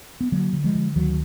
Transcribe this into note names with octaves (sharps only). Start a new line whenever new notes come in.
B3
D3 F#3 A#3
D3
F3 G#3
D3
D2 D#3 F#3